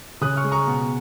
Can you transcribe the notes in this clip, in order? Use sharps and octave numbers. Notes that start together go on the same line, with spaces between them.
C#3 D#6 F#6
C#6 F6
G#3
A#5 C#6
B2